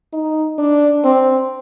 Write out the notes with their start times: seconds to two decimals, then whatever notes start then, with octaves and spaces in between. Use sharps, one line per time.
0.13 D#4
0.59 D4
1.05 C4